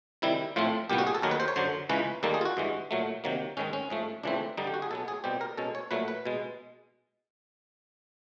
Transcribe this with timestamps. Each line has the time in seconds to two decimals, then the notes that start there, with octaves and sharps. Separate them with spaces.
0.22 C3 D#3 G3 E4
0.56 A2 F3 A3 C4 F4
0.90 C2 A#2 G3 B3 G4
0.98 F#4
1.07 G#4
1.15 A4
1.22 D#2 D#3 F#3 A#4
1.31 B4
1.40 C5
1.48 C#5
1.56 F#2 D3 F#3 C5
1.89 C#2 C#3 E3 G#3 C#4 B4
2.23 D#2 D#3 G3 A#3 A4
2.34 G#4
2.41 F4
2.45 F#4
2.57 G2 E3 G#3
2.91 A#2 F#3 A3
3.24 C3 D#3 F#3 A#3
3.57 G#2 D#3 G#3 C#4
3.73 C#4
3.90 G#2 F3 A3
4.23 C#2 C#3 E3 A3 C4 D4
4.57 G2 D3 G3 D#4
4.67 G4
4.74 F#4
4.82 G#4
4.91 B2 F#3 B3 A4
5.08 G#4
5.24 B2 G3 C4 G4
5.41 A#4
5.57 B2 G#3 C#4 A4
5.75 C#5
5.91 A#2 F#3 A3 B4
6.08 B4
6.25 B2 G#3